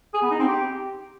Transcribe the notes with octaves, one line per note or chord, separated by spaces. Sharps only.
G#4
B3
D#4
C4
G4